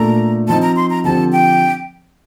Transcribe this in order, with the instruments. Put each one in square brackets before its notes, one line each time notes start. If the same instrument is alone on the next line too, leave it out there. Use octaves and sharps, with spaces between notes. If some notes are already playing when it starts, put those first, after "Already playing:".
Already playing: [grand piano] A#2 A3 D4 A4 [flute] A#5
[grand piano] F3 C4 D#4 [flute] A5
[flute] A#5
C6
A#5
[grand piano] D3 F3 C4 G4 [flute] A5
[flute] G5